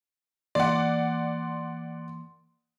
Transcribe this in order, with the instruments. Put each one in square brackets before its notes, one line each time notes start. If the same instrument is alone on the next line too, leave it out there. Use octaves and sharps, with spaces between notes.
[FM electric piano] E3 A#3 C6 [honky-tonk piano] D5 F#5